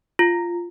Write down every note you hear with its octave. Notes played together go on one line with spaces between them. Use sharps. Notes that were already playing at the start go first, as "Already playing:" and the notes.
F4